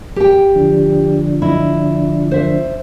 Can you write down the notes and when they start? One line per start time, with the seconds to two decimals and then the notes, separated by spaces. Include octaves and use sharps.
0.16 G4 G5
0.55 D3 F3 D4
1.42 E4 D#5
2.31 C5 E5